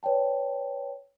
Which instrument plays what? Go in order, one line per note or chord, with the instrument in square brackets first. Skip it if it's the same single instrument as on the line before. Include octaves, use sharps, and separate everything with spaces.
[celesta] B4 C#5 D5 G5 A5